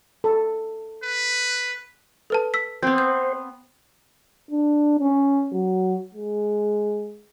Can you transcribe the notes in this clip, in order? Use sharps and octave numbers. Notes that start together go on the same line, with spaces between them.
A4
B4
A4 B4 A5
E6 B6
B3 C4 C5
G6
D4
C#4
F#3
G#3